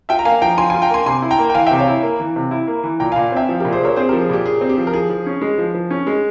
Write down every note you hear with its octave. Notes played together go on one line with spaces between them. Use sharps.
F4 E5 G5
A#5
A#3 F5 G#5
F3 G5 A#5
F3 G#5 C6
G#5 C6
F4
G5 A#5
A#3 G#5 C6
C3 G#5 C6
E4
G5 A#5
A#3
G5
E3 F5 G#5
E5 G5
C3
C#5 F5
E4
A#3
E3
C3
E4
A#3
E3
A#2 G5 A#5
F5 G#5
A#2
C4 E5 G5
F3
G4 A#4
A#2
G#4 C5
A#2 A#4 C#5
C4 G#4 C5
G4 A#4
F3
G#4
A#2 G4
A#2 G#4
C4
G4
F3
A#4
F3 G#4
F3
C#4
G#3
F3
F3
C#4
G#3